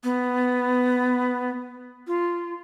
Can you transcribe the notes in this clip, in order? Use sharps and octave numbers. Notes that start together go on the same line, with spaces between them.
B3
F4